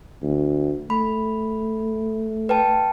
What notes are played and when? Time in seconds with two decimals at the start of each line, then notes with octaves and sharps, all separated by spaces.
0.23 D2
0.90 A3 B5
2.49 B4 G5 A5